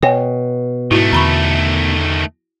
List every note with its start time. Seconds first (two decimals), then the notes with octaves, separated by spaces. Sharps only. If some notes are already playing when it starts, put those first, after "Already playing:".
0.03 B2 C#5 G5 G#5
0.91 G#2 D#3 A3 E4 F#4
1.13 E2 D3 A#5 B5 C#6